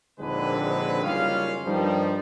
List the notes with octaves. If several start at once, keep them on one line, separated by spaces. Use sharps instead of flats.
A#1 D#2 D3 G#3 C4 B4
F#1 D#3 G3 C#4 F4 F5
G2 D#3 F3 G3